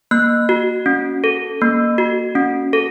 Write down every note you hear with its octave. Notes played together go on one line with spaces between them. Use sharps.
A#3 F#6
F#4
C#4
A4
A#3
F#4
C#4
A4